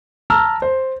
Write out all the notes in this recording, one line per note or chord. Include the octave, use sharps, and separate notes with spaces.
A5 A#5 E6 F6
C5